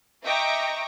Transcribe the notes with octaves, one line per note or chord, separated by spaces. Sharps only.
D#5 E5 G5 A#5 C#6 D6